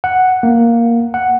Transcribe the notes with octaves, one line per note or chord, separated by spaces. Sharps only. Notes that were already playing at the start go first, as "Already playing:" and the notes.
F#5
A#3
F#5